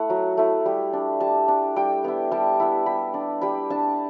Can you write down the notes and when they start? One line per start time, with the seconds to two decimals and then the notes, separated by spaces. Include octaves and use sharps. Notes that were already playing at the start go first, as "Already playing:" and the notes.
Already playing: A3 E4 F#5
0.10 F#3
0.37 A3 E4
0.66 G3
0.93 D4
1.20 G3 A5
1.48 D4
1.76 G3 G5
2.04 B3 E4
2.32 G3 A5
2.60 B3 E4
2.86 G3 B5
3.14 D4
3.42 G3 B5
3.70 D4 A5